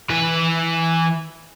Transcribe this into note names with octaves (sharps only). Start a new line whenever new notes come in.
E3 B4